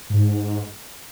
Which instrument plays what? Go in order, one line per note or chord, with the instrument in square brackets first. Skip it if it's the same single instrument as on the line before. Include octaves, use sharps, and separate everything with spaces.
[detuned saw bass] G#2